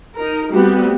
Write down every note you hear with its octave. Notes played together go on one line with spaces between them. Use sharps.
D#4 A#4
G3 A3 B3 C4 F#4